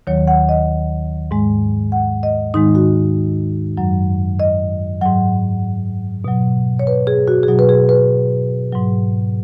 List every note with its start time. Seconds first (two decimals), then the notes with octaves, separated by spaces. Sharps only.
0.07 D#2 D#3 F#3 C#5
0.28 F#5
0.49 D#5
1.31 G#2 G#3
1.92 F#5
2.23 D#5
2.54 G#2 D#3 G#3 D#4
2.75 F#4
3.77 F#2 F#3
4.40 D#5
5.01 G#2 F#3 F#5
6.24 B2 F#3
6.79 C#5
6.87 B4
7.07 G#4
7.28 F#4
7.43 G#4
7.48 B2 F#3 F#4
7.59 B4
7.69 G#4
7.89 B4
8.72 G#2 F#3